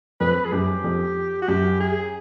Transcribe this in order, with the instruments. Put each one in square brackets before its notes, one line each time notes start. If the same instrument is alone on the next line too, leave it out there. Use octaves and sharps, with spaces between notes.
[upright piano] F2 [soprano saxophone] B4
[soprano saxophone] G#4
[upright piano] F#2 [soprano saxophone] G4
[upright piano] F2
[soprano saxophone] F#4
[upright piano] F#2 [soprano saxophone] G4
[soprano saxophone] G#4